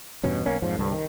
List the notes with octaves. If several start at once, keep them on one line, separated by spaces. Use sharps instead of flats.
E2 G2 B2 C#4
B1 A#3 C#4
F2 G#2 F3
C2 G2 D3
D#3